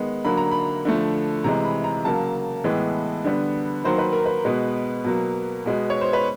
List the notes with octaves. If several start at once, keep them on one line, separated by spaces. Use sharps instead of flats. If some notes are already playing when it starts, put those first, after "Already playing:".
Already playing: D#3 G#3 B3
D3 F#3 A#3 B5
A#5
B5
D3 F3 A3
C3 E3 G#3 A#5
B5
A#5
C#3 F#3 A#3 A5
A2 E3 G#3 B3
D3 G3 B3
D#3 F#3 A#3 C5
B4
A#4
B4
B2 G#3 B3
B2 F#3 A#3
B2 G#3 B3
C#5
C5
B4